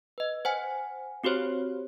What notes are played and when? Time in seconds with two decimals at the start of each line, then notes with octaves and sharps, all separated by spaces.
0.18 B4 D#5
0.45 C5 F#5 G#5
1.24 C4 F#4 G4 C5 C#5